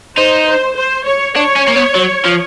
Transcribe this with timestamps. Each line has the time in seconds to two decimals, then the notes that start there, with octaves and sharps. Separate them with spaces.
0.17 D#4 C5
0.47 C5
0.76 C5
1.06 C#5
1.36 D4 C#5
1.56 C#4
1.68 A#3
1.76 B3
1.95 F#3
2.25 F3